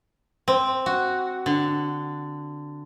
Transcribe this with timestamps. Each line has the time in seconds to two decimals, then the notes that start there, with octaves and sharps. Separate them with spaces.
0.48 C4
0.86 F#4
1.46 D3